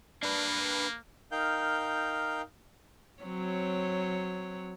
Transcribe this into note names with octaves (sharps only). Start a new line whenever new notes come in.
A#3 D4 B4
D#4 A#4 F5 G5 G6
F#3 C4 C#5